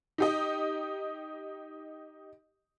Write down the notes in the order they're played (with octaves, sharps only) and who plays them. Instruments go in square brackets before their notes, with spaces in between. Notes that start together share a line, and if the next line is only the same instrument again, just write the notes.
[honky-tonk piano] D#4 G4 D#5